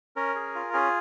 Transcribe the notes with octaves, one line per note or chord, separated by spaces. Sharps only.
C#4 A#4
G#4
F4
C#4 G#4